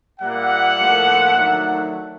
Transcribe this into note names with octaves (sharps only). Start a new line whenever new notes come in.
A#2 G3 A#3 E5 F#5
A2 F3 A#3 D4
D#3 F#3 A3 D4